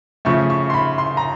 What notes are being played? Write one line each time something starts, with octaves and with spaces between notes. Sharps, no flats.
C#3 F3 A3 C#6
C#6
C6
B5
C6
A#5